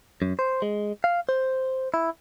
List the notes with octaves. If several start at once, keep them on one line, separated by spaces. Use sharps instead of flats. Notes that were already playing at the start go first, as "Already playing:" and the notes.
F#2
C5
G#3
F5
C5
E4